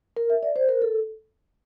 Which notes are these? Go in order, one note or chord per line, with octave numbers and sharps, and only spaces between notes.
A#4
E5
D5
C5
A#4
A4